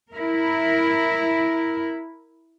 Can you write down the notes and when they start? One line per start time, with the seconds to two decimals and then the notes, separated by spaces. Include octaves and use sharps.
0.12 E4 A#4